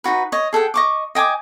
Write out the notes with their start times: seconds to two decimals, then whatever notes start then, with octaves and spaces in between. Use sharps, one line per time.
0.04 D#4 F4 F#4 B4
0.32 C#5 D#5
0.53 G#4 A4 F#5 G5
0.74 D#5 C#6 D6
1.15 D#5 G5 G#5 D6